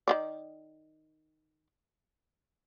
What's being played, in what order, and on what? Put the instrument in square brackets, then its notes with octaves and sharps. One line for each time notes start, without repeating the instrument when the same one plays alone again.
[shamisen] D#3 B3 D5